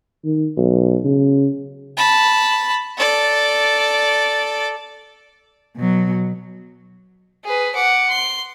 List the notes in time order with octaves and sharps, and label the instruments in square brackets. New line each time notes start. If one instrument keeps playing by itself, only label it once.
[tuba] D#3
B1
C#3
[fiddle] A5 B5
A4 D5
[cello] B2 F#3
[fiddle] G#4 B4
F#5 D6
C6